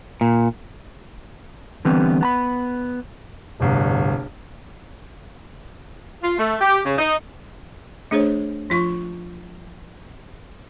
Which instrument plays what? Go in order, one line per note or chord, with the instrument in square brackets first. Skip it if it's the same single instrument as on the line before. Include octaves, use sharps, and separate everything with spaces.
[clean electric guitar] A#2
D3 E3 G3 B3 C4
B3 A#5 B5
[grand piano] D1 G1 C2
[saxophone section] F4
A3
G4
C#3
D#4
[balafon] A3 D4 G#4 C5 C#5
F3 F4 C#6